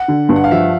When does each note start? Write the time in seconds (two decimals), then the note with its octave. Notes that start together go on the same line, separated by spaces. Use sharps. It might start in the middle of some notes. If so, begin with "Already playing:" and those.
Already playing: F#5
0.08 D3
0.29 G2
0.36 F#5
0.44 F5
0.51 F3 E5